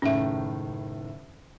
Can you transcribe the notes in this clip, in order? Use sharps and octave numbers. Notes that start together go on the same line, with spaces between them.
F#1 A2 D#3 C#4 E5